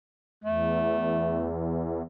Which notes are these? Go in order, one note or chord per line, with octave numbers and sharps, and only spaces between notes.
E2 A3